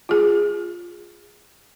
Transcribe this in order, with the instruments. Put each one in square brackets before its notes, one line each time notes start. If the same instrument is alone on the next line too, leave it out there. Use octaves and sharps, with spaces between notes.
[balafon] F4 G#4